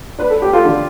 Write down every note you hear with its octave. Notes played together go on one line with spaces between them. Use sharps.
D4 B4
A4
G4
F4 A4
D3